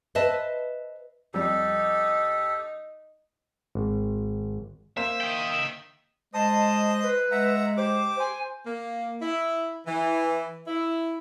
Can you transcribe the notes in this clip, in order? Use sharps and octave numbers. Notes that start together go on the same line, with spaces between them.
B4 C5 D#5 E5 A5
F2 G3 D#4 G4 A4
G#1
A#3 C5 E5 E7
D#5 G5
G#3 C5 D#5 A5 D#6
B4
G#3 E5 F#5 A#5
G4 C5 D6
C5 G#5
A#3
E4
E3
E4